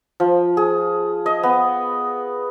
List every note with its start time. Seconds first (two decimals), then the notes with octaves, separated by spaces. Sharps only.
0.20 F3
0.57 G#4
1.26 D#5
1.43 B3